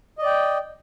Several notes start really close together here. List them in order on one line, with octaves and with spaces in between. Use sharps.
D#5 D5 G5